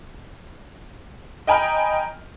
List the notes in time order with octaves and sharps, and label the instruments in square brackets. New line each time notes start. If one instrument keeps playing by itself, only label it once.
[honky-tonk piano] D#5 G5 G#5 A#5 B5 F6